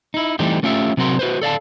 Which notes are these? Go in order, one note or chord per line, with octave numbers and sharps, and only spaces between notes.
D#4 E4
E3 G3 A3 C4 D#4 G4
A3 C#4 F4 G4 E5
C3 F#3 C4 F#4 A#4 C6
F#4 B4 C5
A4 D5 F5 A5